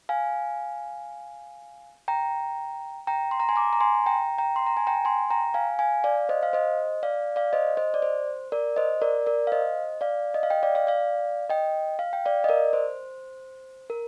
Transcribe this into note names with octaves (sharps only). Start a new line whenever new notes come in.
F5 G#5
G5 A#5
G5 A#5
C6
A#5
G#5 C6
A#5 D6
A#5
G#5 C6
G5 A#5
G5 A#5
C6
A#5
G#5
G5 A#5
G#5 C6
G5 A#5
F5 G#5
F5 G#5
D5 F5
C5 D#5
F5
C5 D#5
D5 F5
D5 F5
C5 D#5
C5 D#5
D5
C5
A#4 D5
C5 D#5
A#4 D5
A#4 D5
F5
C5 D#5
D5 F5
D#5
F5
D#5 G5
D5 F5
D5 F5
D5 F5
D#5 G5
F5
G5
D5 F5
D#5
A#4 D5
C5
A#4